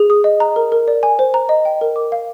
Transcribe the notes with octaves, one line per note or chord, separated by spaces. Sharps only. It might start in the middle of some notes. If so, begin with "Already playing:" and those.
Already playing: G#4
D#6
D#5
A#5
A#4
A#4
D5
G#5
C5
A#5
D#5
G5
A#4
D6
F5